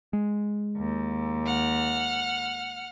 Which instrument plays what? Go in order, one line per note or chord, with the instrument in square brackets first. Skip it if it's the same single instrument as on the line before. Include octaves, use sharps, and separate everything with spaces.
[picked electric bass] G#3
[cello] D#2
[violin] F#5 F6